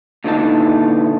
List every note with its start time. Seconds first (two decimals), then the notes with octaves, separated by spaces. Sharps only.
0.24 A#2 D3 E3 G#3 D#4 A5